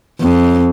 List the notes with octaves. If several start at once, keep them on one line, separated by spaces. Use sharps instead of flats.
F2